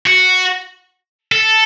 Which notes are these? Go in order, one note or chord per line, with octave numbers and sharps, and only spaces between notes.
F#4
A4